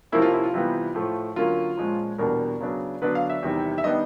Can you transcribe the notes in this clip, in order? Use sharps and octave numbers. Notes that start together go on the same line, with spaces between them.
C3 F3 A#3 C#4 E4
F4
E4
F4
C3 E3 G3 B3 F4
A2 F3 A3
D3 F#3 A#3 C#4 F4
A#2 F3 G#3 C#4
E2 B2 G3 A#3 D4 A#4
C#3 F#3 B3 D4
D3 F#3 B3 D4 B4
F5
E5
E2 C3 D#3 G3
E5
D#3 G3 B3 D4 D#5